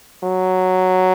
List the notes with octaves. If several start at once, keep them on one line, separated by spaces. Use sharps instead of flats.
F#3